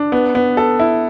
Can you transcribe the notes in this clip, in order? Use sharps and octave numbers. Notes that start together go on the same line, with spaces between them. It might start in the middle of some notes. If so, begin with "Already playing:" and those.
Already playing: D4
B3
B3
A4
E4